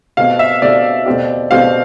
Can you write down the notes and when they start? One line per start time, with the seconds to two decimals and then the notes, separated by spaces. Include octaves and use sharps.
0.17 B2 A3 C4 G4 F5
0.39 E5
0.62 B2 A3 C4 G4 D5
1.06 B2 A3 C4 G4
1.51 B2 A3 C4 G4 F5